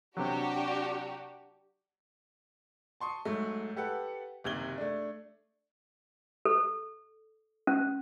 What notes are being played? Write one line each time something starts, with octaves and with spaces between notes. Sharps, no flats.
C3 F#3 D4 F#4 G4
A5 C6 C#6 D#6
G#2 F#3 A3
G4 A4 B4 F#5
F#1 D#2 C3 G#6 F#7 G7
A3 D4
A4
C#4